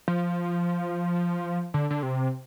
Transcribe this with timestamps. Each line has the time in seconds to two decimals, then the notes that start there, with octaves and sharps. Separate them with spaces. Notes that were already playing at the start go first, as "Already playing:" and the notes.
0.08 F3
1.74 D3
1.90 D3
2.03 C3